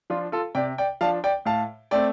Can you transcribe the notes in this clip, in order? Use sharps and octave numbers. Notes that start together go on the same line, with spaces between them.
F3 D4 F4
F4 A4
C3 D5 G5
D5 G5
F3 D4 F5 A5
D5 G5
A2 F5 A5
A3 C4 D5 G5